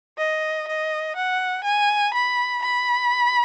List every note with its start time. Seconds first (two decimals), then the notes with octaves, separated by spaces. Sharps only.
0.18 D#5
0.68 D#5
1.16 F#5
1.64 G#5
2.14 B5
2.63 B5